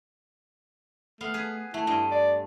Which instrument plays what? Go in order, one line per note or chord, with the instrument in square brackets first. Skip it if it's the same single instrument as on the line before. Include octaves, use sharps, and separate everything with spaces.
[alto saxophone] A3 [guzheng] B3 F5
[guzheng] G#4 B4
[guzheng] A3 [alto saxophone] E4
[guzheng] G2 D#5 G5 [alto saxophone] E4
[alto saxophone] D5